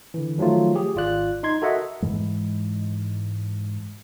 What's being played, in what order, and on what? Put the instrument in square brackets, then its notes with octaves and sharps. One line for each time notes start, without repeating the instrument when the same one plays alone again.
[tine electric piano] D3 E3
D#3 F3 F#3 A3 F4
G4 G#4
G#1 F4 D5 F#6
D#4 C6 G#6
F#4 A4 A#4 D#5 E5 F#5
[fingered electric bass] G#2 E3 G#3